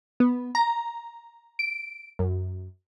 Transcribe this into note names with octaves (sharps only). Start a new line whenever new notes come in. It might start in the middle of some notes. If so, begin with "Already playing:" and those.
B3
A#5
D7
F#2